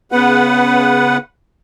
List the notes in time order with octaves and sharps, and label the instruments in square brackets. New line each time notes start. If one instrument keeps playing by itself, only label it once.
[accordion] C#3 B4 F#5 [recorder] B3